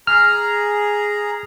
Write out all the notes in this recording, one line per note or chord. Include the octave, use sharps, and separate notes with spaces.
G#4 A#5 F6